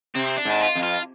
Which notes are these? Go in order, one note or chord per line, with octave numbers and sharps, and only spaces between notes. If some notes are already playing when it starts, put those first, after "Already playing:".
C3 C4
D4
G#2
F4
F2
F4